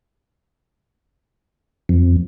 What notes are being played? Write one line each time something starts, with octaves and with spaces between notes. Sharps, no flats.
F2